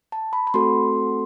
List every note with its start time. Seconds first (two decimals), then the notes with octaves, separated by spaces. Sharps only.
0.12 A5
0.33 B5
0.47 B5
0.54 A3 C4 F#4 A4 C6